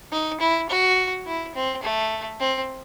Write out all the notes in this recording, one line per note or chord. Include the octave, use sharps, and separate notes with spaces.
D#4
E4
F#4
E4
C4
A3
C4